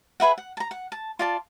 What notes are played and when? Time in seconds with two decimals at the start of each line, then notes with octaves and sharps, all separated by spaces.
0.20 G#4 B4 E5 F#5
0.38 F#5
0.57 A5 A#5
0.71 F#5
0.92 A5
1.19 F4 D5 A5